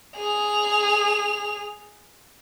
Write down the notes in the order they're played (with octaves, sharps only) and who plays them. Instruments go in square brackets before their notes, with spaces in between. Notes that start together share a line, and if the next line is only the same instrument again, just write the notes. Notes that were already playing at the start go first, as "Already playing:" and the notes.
[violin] G#4 F7